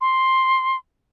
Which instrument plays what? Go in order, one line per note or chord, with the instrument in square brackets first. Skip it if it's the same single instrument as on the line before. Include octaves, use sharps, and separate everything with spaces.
[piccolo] C6